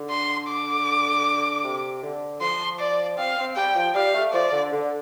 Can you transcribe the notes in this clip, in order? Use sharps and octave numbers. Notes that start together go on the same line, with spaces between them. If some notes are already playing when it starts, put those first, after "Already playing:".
Already playing: D3
C6
D6
C3
D3
F3 C6
D5
C4 F5
C4
G3 G5
F3
G3 F5
A3
F3 D5
D3
D3